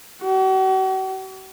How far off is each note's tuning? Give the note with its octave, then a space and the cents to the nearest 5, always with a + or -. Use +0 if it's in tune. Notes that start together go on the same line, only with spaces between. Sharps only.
F#4 +45